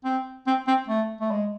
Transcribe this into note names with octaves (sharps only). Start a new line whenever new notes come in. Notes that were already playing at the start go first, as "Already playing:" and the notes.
C4
C4
C4
A3
A3
G#3